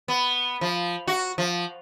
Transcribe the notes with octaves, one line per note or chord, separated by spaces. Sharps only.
B3
F3
F#4
F3